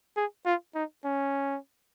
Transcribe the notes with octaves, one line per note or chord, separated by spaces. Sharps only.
G#4
F4
D#4
C#4